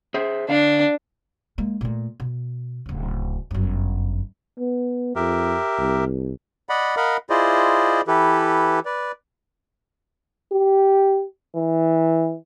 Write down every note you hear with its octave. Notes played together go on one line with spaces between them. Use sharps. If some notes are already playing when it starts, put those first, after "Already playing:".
G#4 C5 E5
D3 D4 F5
G#3 A#3
A#2 A3
B2
D1 C#3
G1 F#2
B3
F2 G4 A#4 E5
C2
D5 D#5 F#5 B5
A#4 D#5 F5 F#5 B5
E4 F4 G#4 C5 D5 D#5
E3 E4 G4 A4 B4
B4 D5
G4
E3